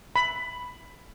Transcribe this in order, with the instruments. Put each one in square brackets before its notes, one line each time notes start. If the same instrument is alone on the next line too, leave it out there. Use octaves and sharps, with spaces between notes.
[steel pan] B5